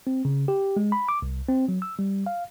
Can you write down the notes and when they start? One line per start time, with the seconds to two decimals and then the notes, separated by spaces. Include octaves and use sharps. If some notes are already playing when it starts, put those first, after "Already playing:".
0.07 C4
0.25 C#3
0.48 G4
0.77 G#3
0.92 B5
1.09 D6
1.22 C2
1.49 C4
1.69 F#3
1.82 E6
1.99 G3
2.26 F5